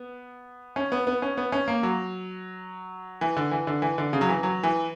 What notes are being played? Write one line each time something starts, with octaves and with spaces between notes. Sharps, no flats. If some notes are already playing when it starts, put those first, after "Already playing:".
Already playing: B3
C#4
B3
B3
C#4
B3
C#4
A#3
F#3
E3
D3
E3
D3
E3
D3
C#3
F#3
E3
F#3
E3